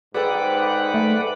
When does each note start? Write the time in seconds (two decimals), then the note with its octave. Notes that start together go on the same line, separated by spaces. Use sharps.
0.15 G#2 G#4 A4 B4 D5 F#5 G5
0.94 A3